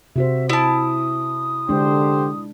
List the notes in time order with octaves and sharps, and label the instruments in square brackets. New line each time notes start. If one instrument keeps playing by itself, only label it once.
[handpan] C3 F#4 C5 [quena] E5
[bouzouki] E4 A5 [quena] D#6
[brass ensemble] D3 G4 C5 [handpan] G#3 D4